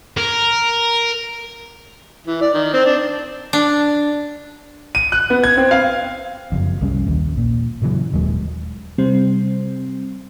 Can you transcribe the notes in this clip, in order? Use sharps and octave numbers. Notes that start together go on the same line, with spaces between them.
A#4
E3
D5
D#3
C4
D4
D4
D#7
F#6
B3
G#6
C4
F5
F#1 F2
C2 G3 C#4
A#1 D#2 A#2
A#2
A#2 C#3 E3 F#3
D#1 D#2 F#3 G#3
C3 G3 C4